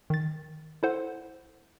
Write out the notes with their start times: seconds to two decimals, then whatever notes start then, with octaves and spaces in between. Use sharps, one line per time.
0.10 D#3 A6
0.83 E4 A4 C5 F#5